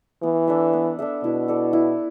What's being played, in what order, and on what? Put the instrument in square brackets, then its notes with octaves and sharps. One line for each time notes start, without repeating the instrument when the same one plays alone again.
[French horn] E3 [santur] B3
[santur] D4 A4 E5
B3
D4 A4 E5
[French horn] B2 [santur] E4
[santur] A4 D5
E4